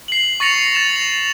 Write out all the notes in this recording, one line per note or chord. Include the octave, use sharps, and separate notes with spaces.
C7 F#7
C#6 A6 A#6 C#7 F7
A6 E7
F7